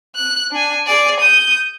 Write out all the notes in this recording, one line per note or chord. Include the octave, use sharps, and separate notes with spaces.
F#6
D4 G#5
G#4 D5
D#6 G6